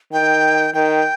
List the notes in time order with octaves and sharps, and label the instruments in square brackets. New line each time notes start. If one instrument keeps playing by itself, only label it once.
[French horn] D#3 [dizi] G5
[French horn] D#3 [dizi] G5